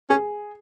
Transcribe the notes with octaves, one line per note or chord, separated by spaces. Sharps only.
C#4 G#4